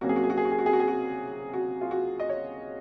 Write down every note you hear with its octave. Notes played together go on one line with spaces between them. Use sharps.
C2 C3 F#3 A#3 C#4 F#4
G#4
F#4
G#4
F#4
G#4
F#4
G#4
F#4
G#4
F#4
G#4
F#4
F#4
F4
F#4
D#5
C#5